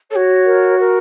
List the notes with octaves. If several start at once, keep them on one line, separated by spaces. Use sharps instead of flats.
F#4 A4 C#5
A#4
A#4